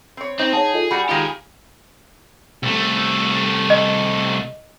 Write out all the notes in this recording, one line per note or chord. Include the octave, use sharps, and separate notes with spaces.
C4 C#5
C4 D#4
G#4 C#5 F#5 A5
F4 A4 D#5
G3 F#4 B5 C#7
D#3 G#3 F4 G4 G#4
C2 A3
D#5